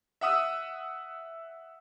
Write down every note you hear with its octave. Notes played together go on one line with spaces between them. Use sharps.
E5 F#5 D#6 E6